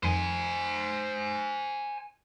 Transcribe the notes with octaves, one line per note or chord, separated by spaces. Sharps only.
F2 D#3 C5 G#5